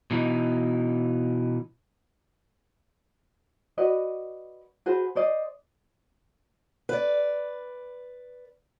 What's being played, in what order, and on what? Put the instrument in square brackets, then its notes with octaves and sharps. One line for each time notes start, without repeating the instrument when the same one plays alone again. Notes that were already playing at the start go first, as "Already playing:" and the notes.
[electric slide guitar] B2 E3 D#4
[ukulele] F#4 B4 D5 D#5
F#4 G#4 B4 C5
C5 D5 D#5
[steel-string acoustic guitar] B4 D5